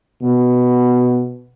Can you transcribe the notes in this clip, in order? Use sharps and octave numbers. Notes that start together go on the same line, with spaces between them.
B2